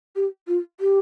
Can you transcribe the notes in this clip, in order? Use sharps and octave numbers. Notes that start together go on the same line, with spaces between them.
G4
F4
G4